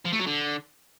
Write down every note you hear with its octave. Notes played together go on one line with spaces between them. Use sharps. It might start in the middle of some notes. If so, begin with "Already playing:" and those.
F3
A3
F#3
D3